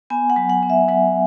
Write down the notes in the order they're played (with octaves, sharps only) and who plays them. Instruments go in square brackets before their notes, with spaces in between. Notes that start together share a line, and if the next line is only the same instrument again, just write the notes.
[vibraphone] B3 G#5
F#5
F#3
F#5
B3
E5
F#3 F#5